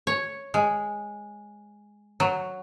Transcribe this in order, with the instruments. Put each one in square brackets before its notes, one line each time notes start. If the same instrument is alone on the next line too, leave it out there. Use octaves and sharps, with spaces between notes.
[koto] C#5
G#3
F#3